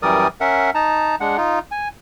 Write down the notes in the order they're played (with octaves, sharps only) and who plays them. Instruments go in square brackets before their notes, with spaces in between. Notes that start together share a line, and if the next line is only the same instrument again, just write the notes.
[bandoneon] F#2 E3 G3 A#4 D5 D#6
C#4 A#4 E5 F#5
D#4 A5 A#5
G#3 D4 F#5
D#4 F4
G#5